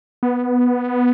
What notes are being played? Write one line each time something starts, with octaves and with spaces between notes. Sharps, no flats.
B3